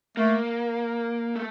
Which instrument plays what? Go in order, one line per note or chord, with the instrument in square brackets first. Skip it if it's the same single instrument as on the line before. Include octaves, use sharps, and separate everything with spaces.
[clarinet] A3 [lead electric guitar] A#3
[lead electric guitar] A3